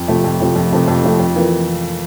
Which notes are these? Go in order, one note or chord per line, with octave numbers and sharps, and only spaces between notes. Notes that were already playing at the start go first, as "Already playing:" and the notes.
Already playing: F2
C3 F3 A3
F2
C3 F3 A3
F2
C3 F3 A3
F2
C3 F3 A3
F2
E3 A#3 F4